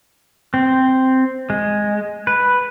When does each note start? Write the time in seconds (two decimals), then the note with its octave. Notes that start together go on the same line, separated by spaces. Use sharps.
0.54 C4
1.50 G#3
2.27 B4